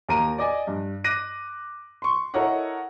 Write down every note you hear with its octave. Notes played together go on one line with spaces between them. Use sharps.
D#2 A#4 A#5 D#7
D5 D#5 G#5
G2
D6 F#6 A#6 D#7
C6 C#6
E4 A4 A#4 C#5 D#5 F#5